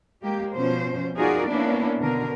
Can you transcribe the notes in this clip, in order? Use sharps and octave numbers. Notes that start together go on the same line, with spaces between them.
G#3 A#3 G4
B2 F3 C#4 C5
D#4 F4 F#4 G#4 A#4 D5
A#3 B3 C#4 D4 E4
B2 D3 A#4